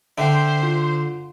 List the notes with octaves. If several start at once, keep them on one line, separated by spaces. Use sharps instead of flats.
D3 C5 E5 G5
F4